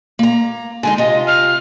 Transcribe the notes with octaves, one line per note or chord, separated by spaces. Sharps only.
A#3 A#5
D3 G#3 D#4 G#5
C3 F4 D#5
F6